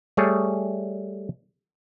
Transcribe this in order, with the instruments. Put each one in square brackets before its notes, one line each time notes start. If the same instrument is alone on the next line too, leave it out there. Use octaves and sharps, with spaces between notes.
[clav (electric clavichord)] G3 A3 G#4 C#5